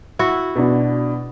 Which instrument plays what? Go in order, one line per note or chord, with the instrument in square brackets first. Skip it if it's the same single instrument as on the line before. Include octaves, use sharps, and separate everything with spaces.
[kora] E4 F#4
[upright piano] B2 D4